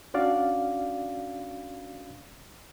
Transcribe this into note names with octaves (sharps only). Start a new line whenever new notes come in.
C#4 D4 F#4 D5 F5